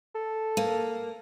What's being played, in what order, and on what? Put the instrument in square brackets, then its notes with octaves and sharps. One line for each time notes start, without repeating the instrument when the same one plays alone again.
[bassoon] A4
[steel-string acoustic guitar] A#3